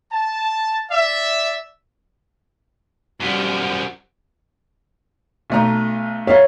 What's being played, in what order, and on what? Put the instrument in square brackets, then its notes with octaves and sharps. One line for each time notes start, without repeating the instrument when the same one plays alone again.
[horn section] A5
D5 E5
[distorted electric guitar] F#2 F3 [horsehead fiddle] G3 F#5
[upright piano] B1 A3 A#5
[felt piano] C#5 [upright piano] E5 F5 A#5